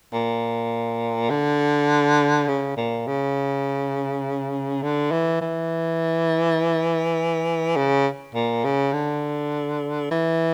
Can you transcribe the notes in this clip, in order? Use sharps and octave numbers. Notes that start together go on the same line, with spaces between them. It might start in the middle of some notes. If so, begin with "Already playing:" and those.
A#2
D3
C#3
A#2
C#3
D3
E3
E3
C#3
A#2
C#3
D3
E3